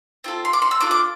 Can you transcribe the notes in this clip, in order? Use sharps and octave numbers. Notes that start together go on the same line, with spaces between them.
C4 F4 A4
C6
D6
C6
E6
D4 F4 A4 D6
D6